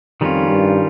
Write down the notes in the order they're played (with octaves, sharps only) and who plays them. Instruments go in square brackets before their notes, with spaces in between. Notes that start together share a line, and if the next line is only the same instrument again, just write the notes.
[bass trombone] F2 [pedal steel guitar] D#3 G3 C#4 F4
[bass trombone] G2